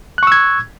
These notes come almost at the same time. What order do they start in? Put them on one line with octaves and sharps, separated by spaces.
F#6 C#6 E6 G#6